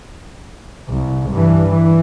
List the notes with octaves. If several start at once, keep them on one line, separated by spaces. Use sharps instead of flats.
C2
G2 E3
E3